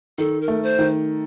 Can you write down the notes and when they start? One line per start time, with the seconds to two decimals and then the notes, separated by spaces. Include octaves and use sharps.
0.18 D#3 A4
0.41 A#4
0.48 A3
0.63 C5
0.79 D#3